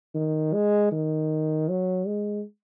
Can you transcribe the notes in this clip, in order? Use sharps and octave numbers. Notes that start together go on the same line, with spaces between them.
D#3
G#3
D#3
F#3
G#3